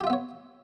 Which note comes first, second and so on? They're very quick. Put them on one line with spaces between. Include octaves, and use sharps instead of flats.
G4 F4 E5 B3 C#5